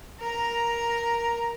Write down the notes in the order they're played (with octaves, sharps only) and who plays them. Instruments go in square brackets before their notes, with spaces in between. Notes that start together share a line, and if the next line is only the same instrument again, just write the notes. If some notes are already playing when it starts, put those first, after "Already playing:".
[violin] A#4 A#5